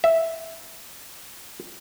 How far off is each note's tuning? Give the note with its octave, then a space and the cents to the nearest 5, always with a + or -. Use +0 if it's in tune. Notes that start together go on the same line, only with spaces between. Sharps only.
E5 -5